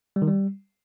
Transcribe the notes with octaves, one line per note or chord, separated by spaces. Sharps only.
G3
D#3
G3